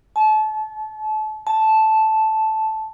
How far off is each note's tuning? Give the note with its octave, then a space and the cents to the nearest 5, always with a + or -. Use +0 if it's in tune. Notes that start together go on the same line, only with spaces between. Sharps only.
A5 -30
A5 -5